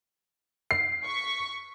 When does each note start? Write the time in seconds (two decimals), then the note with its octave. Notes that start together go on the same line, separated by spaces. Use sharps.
0.71 C7
1.05 C#6 B6